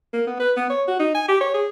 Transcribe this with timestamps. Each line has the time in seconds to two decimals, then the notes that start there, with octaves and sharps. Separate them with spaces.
0.13 A#3
0.27 B3
0.39 B4
0.57 B3
0.70 C#5
0.88 F#4
0.99 D#4
1.14 G#5
1.28 G4
1.41 C#5
1.54 G#4